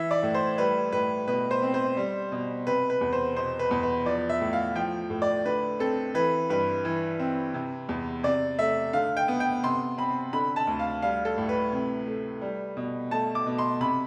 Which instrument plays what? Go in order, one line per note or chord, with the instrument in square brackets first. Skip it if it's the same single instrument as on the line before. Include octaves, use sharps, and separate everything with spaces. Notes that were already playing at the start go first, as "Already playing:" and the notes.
Already playing: [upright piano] E3 E5
D5
A2
C5
G3 B4
A2 B4
B2 B4
C5
C4
C5
G3
B2
C3 B4
B4
E2
C5
B2 C5
B4
E2
B4
F3 D5
E5
A2
F5
F3 G5
A2
D5
D3 B4
C4 A4
E3 B4
G2 B4
E3
C4
C3
E2
C3 D5
A3 E5
D3 F5
G5
B3
G5
C3 C6
C4 B5
D3 B5
A5
D2
F5
G3 F5
A4
A2
B4
C3
A3
G3
B2
A3 A5
D6
B2
C6
C3 B5